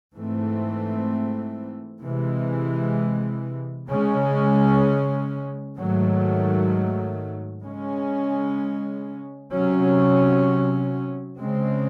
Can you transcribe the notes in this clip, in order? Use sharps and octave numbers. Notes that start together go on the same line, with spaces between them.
G#2 E3 A3 C4
C3 E3 G#3
C#3 G#3 C#4
G#2 D#3 F#3 A3
C#3 G#3 C#4
C3 F#3 C#4
C#3 G#3 C4